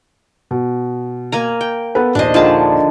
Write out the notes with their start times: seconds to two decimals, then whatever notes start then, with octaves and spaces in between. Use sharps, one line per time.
0.51 B2
1.32 A#3 G#5 A#5
1.61 G5
1.95 B3 A4 B4
2.15 A#1 D#2 D4 C5 D#5
2.34 D3 D#3 F3 G#4 A5